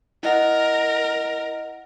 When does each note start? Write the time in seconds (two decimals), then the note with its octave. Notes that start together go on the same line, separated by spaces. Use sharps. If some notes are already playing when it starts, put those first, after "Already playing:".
0.23 E4 A#4 D#5 F#5